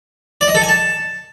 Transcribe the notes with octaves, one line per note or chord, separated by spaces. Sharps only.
D5
D#5
A4
G#5
A5